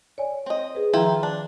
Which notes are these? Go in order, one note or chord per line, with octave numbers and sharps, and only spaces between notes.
C#5 D5 G#5
C4 D#5
G#4 B4
D#3 F3 E4 F4 G5 A#5
D4